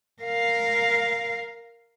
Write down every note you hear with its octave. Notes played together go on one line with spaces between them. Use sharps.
A#4 F5